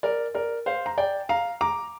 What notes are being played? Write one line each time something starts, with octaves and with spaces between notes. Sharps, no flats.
A#4 D5
A#4 D5
C5 F5
A#5
D5 G5
F5 A#5
A#5 D6